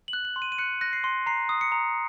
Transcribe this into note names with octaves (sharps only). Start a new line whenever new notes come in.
F#7
F#6
F#7
C6
D#7
D#7
F#6 C#7
F#6 A#6
C7
C6
A#5 C7
D#6
C#7
A#5